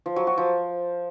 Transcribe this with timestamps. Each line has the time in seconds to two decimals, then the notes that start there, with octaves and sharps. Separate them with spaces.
0.06 F3
0.16 F#3
0.27 F#4
0.38 F3